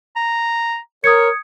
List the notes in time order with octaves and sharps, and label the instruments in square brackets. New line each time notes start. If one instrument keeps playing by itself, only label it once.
[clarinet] A#5
[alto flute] A#4 [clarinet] C#5 [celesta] D#6 G#6 C#7